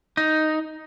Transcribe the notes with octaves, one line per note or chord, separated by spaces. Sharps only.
D#4